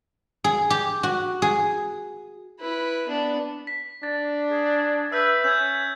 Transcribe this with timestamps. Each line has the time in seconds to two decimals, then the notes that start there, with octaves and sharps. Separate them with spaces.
0.44 G#4
0.70 G4
1.03 F#4
1.42 G#4
2.60 E4 B4
3.08 B3 D4
3.67 B6
4.03 D4 A6
4.51 G#4
5.12 B4 E5 E6 F#6 G6
5.44 C#4 G6 G#6